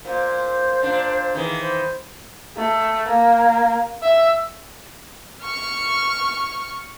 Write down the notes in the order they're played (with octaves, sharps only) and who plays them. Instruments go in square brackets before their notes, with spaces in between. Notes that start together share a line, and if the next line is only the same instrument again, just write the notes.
[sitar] A#2 [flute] C5
[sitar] A#2 D4
[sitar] D#3 E3 [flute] G#4
[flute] C5
[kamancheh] A3
A#3
E5
[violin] C#6 F6